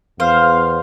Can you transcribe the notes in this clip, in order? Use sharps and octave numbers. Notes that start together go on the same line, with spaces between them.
E2 C5 F5